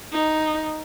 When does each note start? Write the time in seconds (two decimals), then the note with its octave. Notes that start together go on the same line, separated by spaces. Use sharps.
0.12 D#4